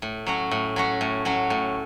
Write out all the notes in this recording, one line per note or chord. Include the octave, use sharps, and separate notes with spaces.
A2
F#3 C#4 F#4
A2
F#3 C#4 F#4
A2
F#3 C#4 F#4
A2